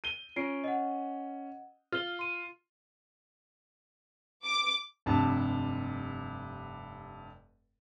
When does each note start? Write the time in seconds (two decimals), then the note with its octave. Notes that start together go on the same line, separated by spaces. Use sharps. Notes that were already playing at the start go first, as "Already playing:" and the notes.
0.04 D#7 G7
0.36 C#4 F4 C7 D7
0.64 D#5 F#5
1.92 F4 F6 G7
2.19 C6 D#7
4.44 D6
5.06 F1 G2 C3 A5